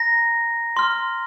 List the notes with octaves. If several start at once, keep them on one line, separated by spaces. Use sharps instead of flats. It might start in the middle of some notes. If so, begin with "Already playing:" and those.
Already playing: A#5 A#6
C6 F6